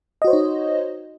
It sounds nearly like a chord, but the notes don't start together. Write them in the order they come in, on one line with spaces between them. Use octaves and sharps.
D#5 F#4 C5 C#5 D#4